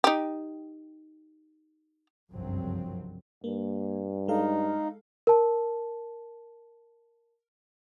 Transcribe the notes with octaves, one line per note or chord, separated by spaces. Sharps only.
D#4 G4
F#1 C2 G2 F3 F#3 C4
G2 A#3
G#3 D#4 A4 F5
A#4 A5